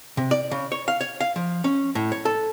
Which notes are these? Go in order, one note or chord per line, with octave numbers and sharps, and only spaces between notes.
C3
D5
C#3
C#5
F5
C#5
F5
F3
C#4
A2
C#5
A4